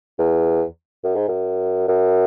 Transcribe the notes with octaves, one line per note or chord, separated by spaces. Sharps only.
E2
F#2
G#2
F#2
F#2